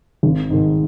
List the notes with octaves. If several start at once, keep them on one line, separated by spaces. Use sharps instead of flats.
G#1
G#2 D#3